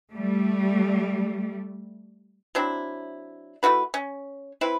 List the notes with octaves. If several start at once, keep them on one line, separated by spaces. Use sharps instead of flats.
G3 A3
F#3 C4 D4 E4
A3 E4 F#4 B4
C#4
C4 E4 B4